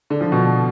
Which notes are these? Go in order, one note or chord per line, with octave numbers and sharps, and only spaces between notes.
D3
F3
B2